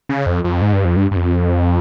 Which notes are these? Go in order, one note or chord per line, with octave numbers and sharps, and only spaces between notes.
C#3
F2
F2
G#2
G2
F2
G2
G2
F2